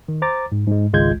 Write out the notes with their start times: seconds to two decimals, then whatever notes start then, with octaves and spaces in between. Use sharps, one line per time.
0.08 D#3
0.22 C5 A#5 D6 A6
0.52 G#2
0.67 G#2 G#3
0.93 G#1 C#2 G#3 F4 G6 G#6